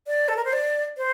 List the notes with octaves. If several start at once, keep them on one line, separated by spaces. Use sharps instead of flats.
D5
A4
A#4
C5
D5
C5